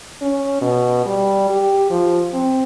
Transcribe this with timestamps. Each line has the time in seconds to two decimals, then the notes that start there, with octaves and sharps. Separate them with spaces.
0.21 C#4
0.61 B2
1.06 G3
1.50 G4
1.90 F3
2.34 C4